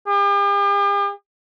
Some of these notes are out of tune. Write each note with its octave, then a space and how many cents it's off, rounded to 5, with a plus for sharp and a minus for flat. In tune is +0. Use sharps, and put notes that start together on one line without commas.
G4 +45